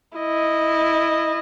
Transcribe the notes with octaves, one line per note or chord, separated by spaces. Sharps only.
E4 D#5